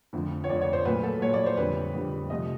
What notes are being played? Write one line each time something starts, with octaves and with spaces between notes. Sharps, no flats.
F2 D3 F3 A3
C#5
F2 D3 F3 A3 D5
C#5
C5
A#2 F#3 A3 B4
A4
A#2 F#3 A3 C#5
D5
C5
F2 D3 G3 B4
F2 D3 G3
C3 F3 A3 D#5